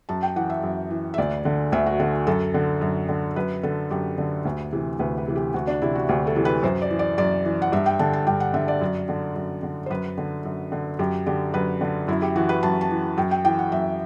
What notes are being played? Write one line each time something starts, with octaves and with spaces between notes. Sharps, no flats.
F#2 A5
G5
E3 F#5
E5
F#2
E3
E5
D2 D5
D3
D2 E5
F#4
D3 F#4
F#2 A4
D3
F#2
D3
F#2 B4
D3 A4
F#2 G4
D3
D2
C3 E3
D2 B4
B4
C3 E3
G4
D2 F#4
D4
C3 E3 E4
F#4
D2 G4
A4
C3 E3
B4
F#2 C5
D5
E3
D5
F#2 D5
E3
F#5
G2 E5
G5
D3 A5
A5
G2 G5
F#5
D3 E5
D5
F#2
D3
F#2
D3
C5
F#2 B4
D3
F#2
D3
F#2 G4
D3 G4
F#2 B4
D3
F#2 E4
G4
E3 F#4
B4
F#2 A5
A5
E3
F#2 G5
G5
E3 G5
F#5
F#2 E5